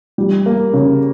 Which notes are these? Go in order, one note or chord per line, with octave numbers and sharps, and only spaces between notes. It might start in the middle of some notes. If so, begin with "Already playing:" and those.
G3
A#3
C#3